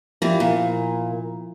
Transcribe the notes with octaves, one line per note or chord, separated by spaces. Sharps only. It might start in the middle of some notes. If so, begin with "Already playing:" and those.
E3 F3 G3 A#3 E4
A#2